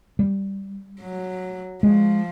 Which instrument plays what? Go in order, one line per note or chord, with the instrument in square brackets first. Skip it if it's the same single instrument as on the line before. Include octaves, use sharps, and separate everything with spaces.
[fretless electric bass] G3
[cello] F#3
[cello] F3 [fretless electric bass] G#3